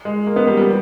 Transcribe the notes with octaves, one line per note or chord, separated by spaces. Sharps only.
G#3
A#3
B3
G3
G3